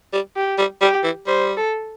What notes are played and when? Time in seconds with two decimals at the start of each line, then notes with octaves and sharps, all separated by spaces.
0.13 G3
0.36 G4
0.58 G3
0.81 G3 G4
1.04 E3
1.26 G3 C5
1.57 A4